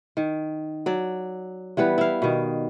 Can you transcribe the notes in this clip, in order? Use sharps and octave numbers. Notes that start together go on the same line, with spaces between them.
D#3
F#3 D5
E3 G3 B3 B4
E4 F5
B2 D#3